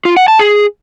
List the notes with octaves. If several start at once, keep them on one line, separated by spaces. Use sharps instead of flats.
F4
F#5
A5
G#4